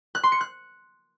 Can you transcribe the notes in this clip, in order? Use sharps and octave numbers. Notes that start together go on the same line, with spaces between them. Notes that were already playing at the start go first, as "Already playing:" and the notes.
F#6
C6
C#7
F#6